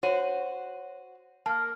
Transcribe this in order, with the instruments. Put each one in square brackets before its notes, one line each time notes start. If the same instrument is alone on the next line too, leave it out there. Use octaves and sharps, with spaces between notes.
[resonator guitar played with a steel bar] F#4 C5 [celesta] C#5 D#7
[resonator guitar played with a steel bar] A#3 [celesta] A5 F6